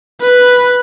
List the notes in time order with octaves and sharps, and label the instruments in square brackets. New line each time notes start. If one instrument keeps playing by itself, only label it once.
[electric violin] B4